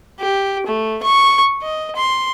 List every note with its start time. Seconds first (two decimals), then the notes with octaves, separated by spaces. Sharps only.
0.20 G4
0.67 A3
1.03 C#6
1.62 D#5
1.96 C6